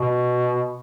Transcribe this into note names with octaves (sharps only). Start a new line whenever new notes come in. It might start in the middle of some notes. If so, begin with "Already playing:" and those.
Already playing: B2